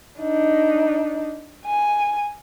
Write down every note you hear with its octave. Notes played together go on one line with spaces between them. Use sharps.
D4 D#4
G#5